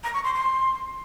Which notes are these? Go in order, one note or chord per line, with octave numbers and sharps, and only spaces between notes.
A#5
C#6
C6
C6